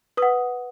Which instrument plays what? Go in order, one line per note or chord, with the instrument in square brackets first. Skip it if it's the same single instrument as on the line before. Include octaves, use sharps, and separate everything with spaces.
[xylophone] B4 F#5 D#6